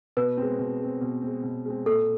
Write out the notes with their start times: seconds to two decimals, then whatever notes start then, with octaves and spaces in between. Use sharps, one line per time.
0.17 B2 B4
0.37 G#3 C4
0.59 B2
0.80 G#3 C4
1.01 B2
1.22 G#3 C4
1.44 B2
1.65 G#3 C4
1.86 A#2 A4